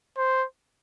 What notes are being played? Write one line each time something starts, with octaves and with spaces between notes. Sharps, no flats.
C5